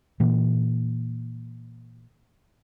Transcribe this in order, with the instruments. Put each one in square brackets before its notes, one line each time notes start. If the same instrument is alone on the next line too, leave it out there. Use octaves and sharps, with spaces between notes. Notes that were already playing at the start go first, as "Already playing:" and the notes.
[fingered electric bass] A#2 E3 A#3